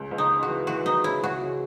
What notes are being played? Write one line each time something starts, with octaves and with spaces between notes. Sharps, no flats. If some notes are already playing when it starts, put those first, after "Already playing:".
Already playing: C#2
C#2
D#4
G#3
F#4
E3
E3 F#4
E3 D#4
C#3 E4
C#2 F#4
C#3